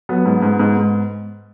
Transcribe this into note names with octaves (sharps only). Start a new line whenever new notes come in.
F#3 B3
G#2
G#2
G#2
G#2